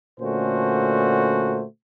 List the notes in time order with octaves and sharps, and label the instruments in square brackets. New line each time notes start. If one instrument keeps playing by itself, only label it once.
[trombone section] A#2 D3 A3 C#4 F#4 C5